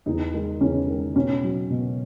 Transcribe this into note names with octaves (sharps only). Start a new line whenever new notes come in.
E2 D#4
D#3 G#3
E2 C#4
D#3 G#3
B2 C#4
F#3
B2